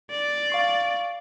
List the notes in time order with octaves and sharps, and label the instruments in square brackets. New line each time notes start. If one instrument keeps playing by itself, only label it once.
[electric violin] D5
[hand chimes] F5 C#6 C7